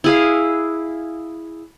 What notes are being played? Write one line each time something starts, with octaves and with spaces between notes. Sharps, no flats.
E4 G#4 F5